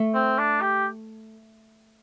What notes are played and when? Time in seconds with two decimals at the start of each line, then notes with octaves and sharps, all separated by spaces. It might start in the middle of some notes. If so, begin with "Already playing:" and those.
Already playing: A3
0.14 C4
0.38 D4
0.61 G4